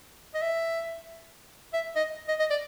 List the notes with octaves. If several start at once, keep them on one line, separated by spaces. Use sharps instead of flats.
D#5
E5
E5
D#5
D#5
D#5
D5